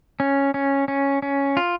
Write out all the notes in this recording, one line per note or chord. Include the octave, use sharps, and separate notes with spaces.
C#4
C#4
C#4
C#4
F4